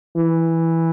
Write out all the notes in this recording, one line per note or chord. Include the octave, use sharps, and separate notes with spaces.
E3